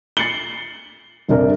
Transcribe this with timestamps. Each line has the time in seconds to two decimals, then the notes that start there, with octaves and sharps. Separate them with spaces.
0.17 A6 C7 C#7 F#7 G7
1.28 G1 C3 D4 A#4